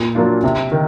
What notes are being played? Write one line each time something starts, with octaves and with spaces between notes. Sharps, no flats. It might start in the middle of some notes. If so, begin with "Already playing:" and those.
Already playing: A#2
F#3 A#3 D4 F4
C3
D#3